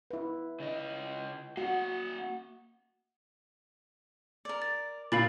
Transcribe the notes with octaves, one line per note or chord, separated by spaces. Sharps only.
E4 B4
C#3 D#5
A#3 F#4 F#5
A#4 D5
A6
A#2 F5 B5 A6